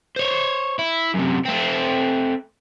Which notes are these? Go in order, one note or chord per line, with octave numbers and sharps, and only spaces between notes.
C5 C#5
E4
F#2 C3
A3 C4